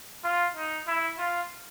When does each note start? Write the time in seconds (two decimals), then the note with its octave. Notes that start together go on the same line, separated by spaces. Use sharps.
0.24 F4
0.56 D#4
0.87 E4
1.19 F4